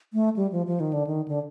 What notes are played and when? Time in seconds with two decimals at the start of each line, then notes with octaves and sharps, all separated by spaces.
0.13 A3
0.36 G3
0.52 F3
0.67 F3
0.80 D#3
0.93 D3
1.07 D#3
1.28 D3